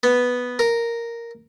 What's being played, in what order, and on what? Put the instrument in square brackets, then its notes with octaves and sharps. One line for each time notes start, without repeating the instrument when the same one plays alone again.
[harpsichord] B3
A#4